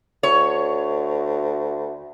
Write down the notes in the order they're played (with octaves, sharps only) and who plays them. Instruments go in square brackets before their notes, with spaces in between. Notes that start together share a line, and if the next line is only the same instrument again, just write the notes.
[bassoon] D2 [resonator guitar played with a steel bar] C#5